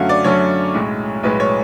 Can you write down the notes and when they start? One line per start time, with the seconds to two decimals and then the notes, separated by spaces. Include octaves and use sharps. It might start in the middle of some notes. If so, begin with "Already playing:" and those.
Already playing: F#2 D3 F#3 A3 C#4 F5 F#5
0.09 D5
0.24 F#2 D3 F#3 A3 C#4 C#5
0.74 B1 A2 G#3
1.23 B1 A2 G#3 B4
1.40 C#5